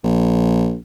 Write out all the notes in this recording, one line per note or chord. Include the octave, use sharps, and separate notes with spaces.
A#1